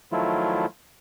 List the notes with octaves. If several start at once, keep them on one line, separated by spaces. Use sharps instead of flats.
D#3 F3 F#3 A3 E4 F4